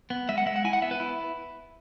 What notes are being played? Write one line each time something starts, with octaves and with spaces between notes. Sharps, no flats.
B3
G#3 E5
F#5
G#3 E5
F#5
E4 G#5
F#5
B3 E5
B4
E4